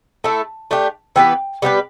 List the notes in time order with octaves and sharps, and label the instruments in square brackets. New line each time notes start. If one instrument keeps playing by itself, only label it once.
[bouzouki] A3 E4 A4 [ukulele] A5
[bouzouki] A3 D4 G4
[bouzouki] E3 B3 G4 B4 [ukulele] G5
[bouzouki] G3 B3 G4 B4